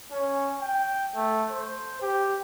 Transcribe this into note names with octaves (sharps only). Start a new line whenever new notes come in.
C#4
G5
A3
C5
G4